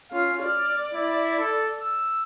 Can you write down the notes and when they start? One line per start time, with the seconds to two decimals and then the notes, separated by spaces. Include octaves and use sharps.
0.12 C#4 F4 F5
0.43 D5 F6
0.94 E4
1.39 A4
1.80 E6